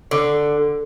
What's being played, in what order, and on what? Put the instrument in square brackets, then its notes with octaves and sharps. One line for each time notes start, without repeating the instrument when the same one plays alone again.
[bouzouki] D3